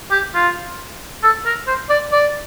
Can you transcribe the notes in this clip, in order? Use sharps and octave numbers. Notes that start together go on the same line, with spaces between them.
G4
F4
A4
A#4
C5
D5
D5